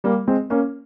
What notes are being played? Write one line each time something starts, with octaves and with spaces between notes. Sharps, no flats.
G3 A#3
G#3 C4
A#3 C#4